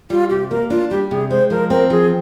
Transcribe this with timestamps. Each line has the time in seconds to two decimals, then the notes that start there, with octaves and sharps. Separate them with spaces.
0.10 G3 F4
0.30 C3 G4
0.51 A#3 A#4
0.70 D4 F4
0.91 G3 G4
1.11 C3 G#4
1.30 G#3 C5
1.50 F3 A#4
1.70 C4 A#4
1.90 F3 G#4